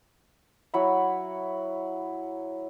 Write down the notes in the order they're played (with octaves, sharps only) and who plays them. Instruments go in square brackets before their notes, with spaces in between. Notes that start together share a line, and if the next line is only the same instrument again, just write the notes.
[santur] F#3 E4 F#5 B5